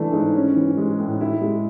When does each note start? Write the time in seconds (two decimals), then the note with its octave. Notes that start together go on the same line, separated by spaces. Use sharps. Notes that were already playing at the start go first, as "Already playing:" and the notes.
Already playing: E3 A3 D4
0.12 G#2
0.34 C#4
0.56 E3
0.77 G#3
0.99 A2
1.21 E4
1.41 G#3